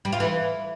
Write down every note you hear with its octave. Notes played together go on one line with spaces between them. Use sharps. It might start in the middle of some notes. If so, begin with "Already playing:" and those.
G3
F4
E3